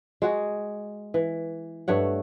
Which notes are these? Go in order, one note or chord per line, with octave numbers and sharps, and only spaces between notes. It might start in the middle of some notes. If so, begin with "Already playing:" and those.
G#3 F#4 G#4
E3
G2 A3 C#5 F#5